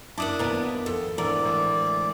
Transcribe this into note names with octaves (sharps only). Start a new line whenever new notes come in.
F#2 D4 E4 A5 D6 D#6
D#2 B3 A#4
F2 A4
D2 G#2 E3 A#4 D5
A2